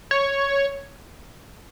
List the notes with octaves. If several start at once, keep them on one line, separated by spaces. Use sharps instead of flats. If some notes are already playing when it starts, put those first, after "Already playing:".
C#5